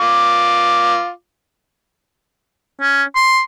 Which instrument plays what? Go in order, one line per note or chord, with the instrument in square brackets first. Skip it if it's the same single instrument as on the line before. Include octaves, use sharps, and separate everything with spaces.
[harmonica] F4 D6
[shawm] C#4
C6